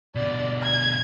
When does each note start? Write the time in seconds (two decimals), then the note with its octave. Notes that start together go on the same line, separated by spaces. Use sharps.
0.15 B2 D3 D5
0.63 G#6